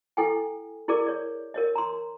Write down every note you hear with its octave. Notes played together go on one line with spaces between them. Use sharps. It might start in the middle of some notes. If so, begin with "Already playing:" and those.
E4 A4 G5 G#5
E4 G#4 A#4 D5 D6
C#5 D5
A#4 C#5 D#5
A#5 C6